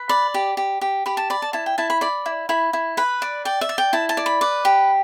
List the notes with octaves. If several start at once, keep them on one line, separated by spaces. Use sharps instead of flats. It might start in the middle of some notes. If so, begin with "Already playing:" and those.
Already playing: B4
D5 B5
G4
G4
G4
G4 B5
A5
D5 B5
A5
E4 A5
G5
E4 A5
B5
D5 B5
E4
E4 B5
E4
B4 B5
D5
D5 G5
E5
D5
G5
E4 A5
A5
D5
B5
B4 D6
G4